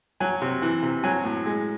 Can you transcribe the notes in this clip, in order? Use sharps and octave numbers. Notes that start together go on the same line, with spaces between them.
F#3 G#5
C3
E3
C3
F#3 G#5
A2
G#3